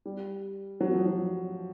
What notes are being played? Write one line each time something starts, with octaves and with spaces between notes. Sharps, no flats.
G3
F#3
F3
F#3